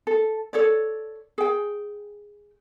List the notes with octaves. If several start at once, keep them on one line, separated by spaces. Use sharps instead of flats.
A4
A4 C#5 D5
G#4 G5